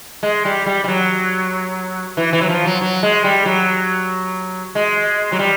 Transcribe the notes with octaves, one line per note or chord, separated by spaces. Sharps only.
G#3
G3
G3
G3
F#3
E3
E3
F#3
F3
F#3
F#3
G#3
G3
F#3
G#3
F#3
G3